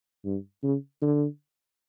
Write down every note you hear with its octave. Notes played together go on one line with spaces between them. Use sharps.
G2
C#3
D3